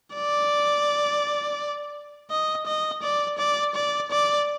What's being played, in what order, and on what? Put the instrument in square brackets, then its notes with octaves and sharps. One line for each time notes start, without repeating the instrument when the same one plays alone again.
[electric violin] D5
D#5
D#5
D5
D5
D5
D5